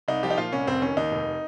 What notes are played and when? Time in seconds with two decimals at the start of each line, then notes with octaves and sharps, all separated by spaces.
0.08 C2 D#4
0.23 F3 G4
0.30 D#4
0.38 A#2 F4
0.52 C2 C#4
0.67 F1 C4
0.82 D#3 C#4
0.97 D#2 D#4
1.12 F1